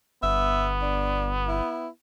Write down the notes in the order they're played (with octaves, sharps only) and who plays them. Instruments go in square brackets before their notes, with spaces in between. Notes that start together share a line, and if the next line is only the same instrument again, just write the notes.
[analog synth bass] G1 [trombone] B3 [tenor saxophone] E5
[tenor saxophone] D4
E4